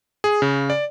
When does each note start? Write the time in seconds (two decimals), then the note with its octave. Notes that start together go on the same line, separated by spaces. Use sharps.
0.24 G#4
0.42 C#3
0.70 D5